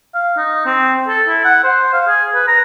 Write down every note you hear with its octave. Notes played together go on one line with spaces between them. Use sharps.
F5
D#4
C4
A4
E4
F#5
C5
F5
G#4
B4
A#5